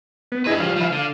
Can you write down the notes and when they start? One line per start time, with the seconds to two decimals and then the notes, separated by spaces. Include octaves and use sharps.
0.32 B3
0.47 D4 E4 G#4 B4 D#5
0.60 F3 G3 F5
0.77 F3 E4
0.93 D3